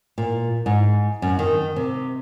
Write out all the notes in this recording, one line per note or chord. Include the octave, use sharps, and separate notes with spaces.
A#2
G#2
F#2
D#3
C3